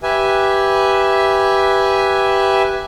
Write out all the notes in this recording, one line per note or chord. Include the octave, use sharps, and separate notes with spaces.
G4 B4 E5 G#5